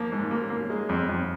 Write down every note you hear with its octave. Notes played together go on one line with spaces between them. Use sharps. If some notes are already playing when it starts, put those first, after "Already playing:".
Already playing: F3 A#3
G#2
A#3
A#3
G#3
F2
F2